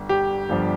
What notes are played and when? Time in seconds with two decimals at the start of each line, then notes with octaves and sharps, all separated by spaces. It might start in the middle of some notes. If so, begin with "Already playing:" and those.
Already playing: G1 G2
0.09 G4
0.49 G1 G2 F3